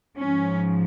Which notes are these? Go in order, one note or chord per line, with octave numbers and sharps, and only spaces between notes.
G#2 F3 C#4